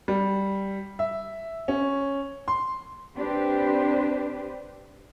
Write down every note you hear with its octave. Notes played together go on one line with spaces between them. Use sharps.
G3
E5
C#4
C6
C4 D4 G4 B4 C5